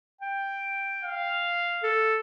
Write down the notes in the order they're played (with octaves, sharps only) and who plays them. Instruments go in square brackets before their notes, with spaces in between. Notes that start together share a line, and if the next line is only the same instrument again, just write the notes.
[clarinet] G5
[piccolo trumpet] F5
[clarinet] A4